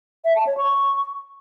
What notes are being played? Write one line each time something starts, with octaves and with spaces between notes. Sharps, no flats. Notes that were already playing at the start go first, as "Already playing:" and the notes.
E5
A5
C#5
C#6